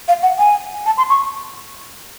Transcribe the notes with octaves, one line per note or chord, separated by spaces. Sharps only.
F5
F#5
G#5
A5
C6
C#6